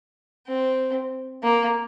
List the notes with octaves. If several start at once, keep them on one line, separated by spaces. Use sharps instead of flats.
C4
A#3